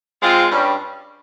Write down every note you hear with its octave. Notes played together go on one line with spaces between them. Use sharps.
G#3 C4 F4
G2 G3 C#4